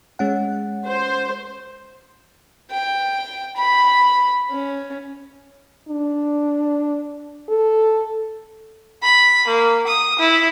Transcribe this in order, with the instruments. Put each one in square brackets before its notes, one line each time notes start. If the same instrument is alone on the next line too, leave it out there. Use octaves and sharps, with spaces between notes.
[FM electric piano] G#3 C#4 F#5
[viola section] C5
[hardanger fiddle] G5
B5
C#4
[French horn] D4
A4
[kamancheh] B5
A#3
D#6
E4